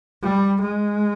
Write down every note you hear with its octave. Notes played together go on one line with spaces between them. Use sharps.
G3
G#3